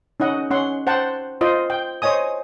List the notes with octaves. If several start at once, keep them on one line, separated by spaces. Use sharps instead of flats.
C#4 D#4 D#5 F#5
C#4 F#5 C6
C5 F#5 G5 A5
F4 C5 D#5
G5
C5 C#5 D#5 G#5 D#6